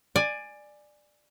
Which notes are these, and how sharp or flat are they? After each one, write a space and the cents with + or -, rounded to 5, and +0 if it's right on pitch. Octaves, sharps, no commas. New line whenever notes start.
D5 +15 G#5 +0